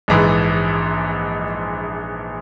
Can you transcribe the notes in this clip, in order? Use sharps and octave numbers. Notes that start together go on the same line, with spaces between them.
A#1 G#2 E3